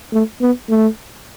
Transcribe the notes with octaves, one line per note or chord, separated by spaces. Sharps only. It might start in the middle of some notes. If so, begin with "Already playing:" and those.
A3
B3
A3